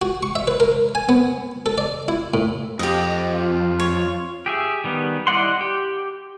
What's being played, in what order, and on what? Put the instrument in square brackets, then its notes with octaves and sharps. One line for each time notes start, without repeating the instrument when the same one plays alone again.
[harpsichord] F#4
C#6
E5
B4
A#4
G#5
B3
A4
D5
E4
A2
[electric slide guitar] F2 [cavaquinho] G4 D#5
[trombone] F4
[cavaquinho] C#5
[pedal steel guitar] G4 G#4 E5
D#3 G3 B3
E4 D5 D#5 F#5 C6
G4